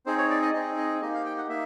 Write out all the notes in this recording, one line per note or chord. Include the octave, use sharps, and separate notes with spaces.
C4 D#4 G#4 C5
C#5
D5
D#5
C4 D#4 G#4 D#5
D#5
A#3 D#4 G4 D#5
F5
G5
F#5
A#3 D#4 E5